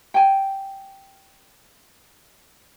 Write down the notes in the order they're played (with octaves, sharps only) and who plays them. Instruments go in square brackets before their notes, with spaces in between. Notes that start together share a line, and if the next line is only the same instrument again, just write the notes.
[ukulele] G5 G#5